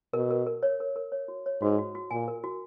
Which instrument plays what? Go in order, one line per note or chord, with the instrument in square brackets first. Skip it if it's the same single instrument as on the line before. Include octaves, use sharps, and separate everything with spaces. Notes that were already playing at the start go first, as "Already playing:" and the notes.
[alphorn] B2 [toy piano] A#4
[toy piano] A#4
A#4
C#5
A#4
A#4
C#5
F#4
C#5
[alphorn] G#2 [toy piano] F#4
[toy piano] F#4
F#4
[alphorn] A#2 [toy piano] G#5
[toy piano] A#4
F#4